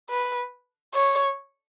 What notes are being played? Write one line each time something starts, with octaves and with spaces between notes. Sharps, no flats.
B4
C#5